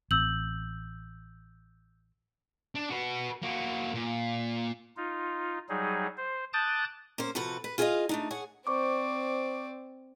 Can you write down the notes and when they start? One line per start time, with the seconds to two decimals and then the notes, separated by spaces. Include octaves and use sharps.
0.11 A1 C4 E6 G6 F#7
2.75 D4
2.90 F#4 B4
3.43 A#3 F#4
3.94 A#2
4.97 D#4 F4
5.69 F#3 G3 D#4 G#4
6.17 C5
6.53 A5 D6 D#6 F#6 G6 A6
7.18 A#3 C#4 C5
7.35 C3 F3 F#4 A4 B4
7.64 B4
7.78 F4 G#4 C5 D5 D#5 F5
8.09 A3 D4 D#4
8.31 G#4 C#5 F#5
8.67 C4 C5 D5 C#6 D6